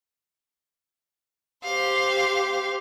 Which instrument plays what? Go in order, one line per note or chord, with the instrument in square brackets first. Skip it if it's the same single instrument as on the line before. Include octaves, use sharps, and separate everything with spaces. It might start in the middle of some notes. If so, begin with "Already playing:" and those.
[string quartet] G4 C5 F5